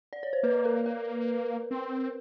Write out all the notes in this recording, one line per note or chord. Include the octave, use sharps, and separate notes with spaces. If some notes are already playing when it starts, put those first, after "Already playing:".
D5
C#5
C5
A#3 B4
A#4
A#4
C4